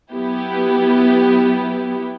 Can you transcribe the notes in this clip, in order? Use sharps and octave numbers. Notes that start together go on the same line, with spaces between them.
F#3 B3 E4 G4